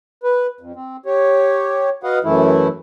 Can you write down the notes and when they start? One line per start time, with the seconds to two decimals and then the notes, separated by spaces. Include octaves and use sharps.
0.23 B4
0.61 F2
0.75 C4
1.06 G4 C#5
2.03 F#4 B4 D#5 F5 F#5
2.24 F#2 E3 A3 E4